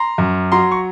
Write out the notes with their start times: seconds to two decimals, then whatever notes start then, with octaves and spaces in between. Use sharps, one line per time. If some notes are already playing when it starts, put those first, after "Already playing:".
Already playing: A#5 C6
0.18 F#2
0.52 F#3 A#5 C6
0.71 C#6